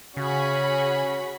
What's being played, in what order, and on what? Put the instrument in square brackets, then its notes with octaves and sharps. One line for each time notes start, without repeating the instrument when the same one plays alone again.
[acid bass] C#3 [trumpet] C#4 [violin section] F#4 G#4 B5